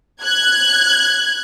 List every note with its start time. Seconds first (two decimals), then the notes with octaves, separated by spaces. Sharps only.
0.22 F#6 G#6